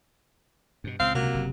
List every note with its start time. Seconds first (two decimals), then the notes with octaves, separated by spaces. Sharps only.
0.84 G2 B2
1.00 C#2 A#2 C4 F5
1.15 C3 F#3 A#3
1.34 F#1